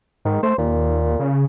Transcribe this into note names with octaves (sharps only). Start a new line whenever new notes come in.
G#2 D#3
A3 C5
D#2 A#2
C#3